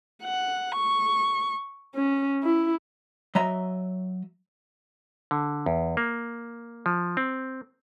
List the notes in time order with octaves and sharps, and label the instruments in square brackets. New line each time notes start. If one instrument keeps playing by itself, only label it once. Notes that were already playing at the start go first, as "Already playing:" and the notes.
[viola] F#5
C#6
C#4
E4
[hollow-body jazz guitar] F#3 D#5 E5 A#5
[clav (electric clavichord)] D3
E2
A#3
F3
C4